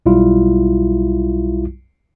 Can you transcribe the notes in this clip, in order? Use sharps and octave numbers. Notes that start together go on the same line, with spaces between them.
B1 G3 E4 F4